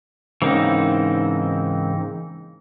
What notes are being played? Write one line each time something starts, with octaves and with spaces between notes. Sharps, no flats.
G#2 C#3 E3 A#3 C4 D#4